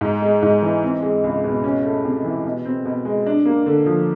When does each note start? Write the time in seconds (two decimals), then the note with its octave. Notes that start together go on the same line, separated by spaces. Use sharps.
0.01 G#2
0.22 G#3
0.42 G#2
0.62 E3
0.83 C4
1.02 G#3
1.24 C#2
1.44 B2
1.64 C#4
1.84 A3
2.05 C3
2.25 E3
2.45 B2
2.65 C4
2.85 B2
3.05 G#3
3.26 D4
3.45 A#3
3.66 D3
3.86 F3